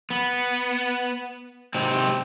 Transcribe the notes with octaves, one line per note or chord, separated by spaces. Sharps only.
B3
G#2 C3 C4